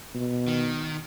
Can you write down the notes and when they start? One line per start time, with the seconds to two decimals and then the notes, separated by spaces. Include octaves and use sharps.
0.15 B2
0.48 D#3